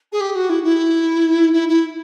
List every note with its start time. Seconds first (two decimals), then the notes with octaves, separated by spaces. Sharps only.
0.12 G#4
0.20 G4
0.35 F#4
0.49 E4
0.63 E4
1.53 E4
1.68 E4